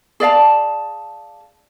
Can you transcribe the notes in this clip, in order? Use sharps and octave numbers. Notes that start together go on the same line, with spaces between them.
G#4 D5 F5 A5